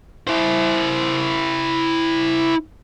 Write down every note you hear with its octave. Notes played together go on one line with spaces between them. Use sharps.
E4 C5